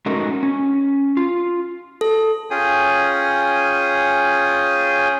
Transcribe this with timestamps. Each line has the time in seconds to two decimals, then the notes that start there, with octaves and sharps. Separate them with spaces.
0.06 G#3 A3 C#4 D#4 F#4 A#4
0.43 C#4
1.17 F4
2.01 A4
2.51 C#4 F4 G#4 G5 D#6